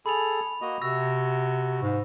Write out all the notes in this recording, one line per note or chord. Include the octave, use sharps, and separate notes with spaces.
G#4 A4 B5 F7
A#3 F#4 D#5
C3 F#4 E6 A#6
G#2